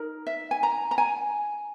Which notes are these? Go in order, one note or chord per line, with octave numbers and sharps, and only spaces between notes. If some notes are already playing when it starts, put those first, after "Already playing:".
Already playing: D#4 A#4
E5
G#5
A#5
A#5
G#5